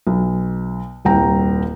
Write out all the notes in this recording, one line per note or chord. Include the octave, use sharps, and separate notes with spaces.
B1
D#1 C2 G5 A#5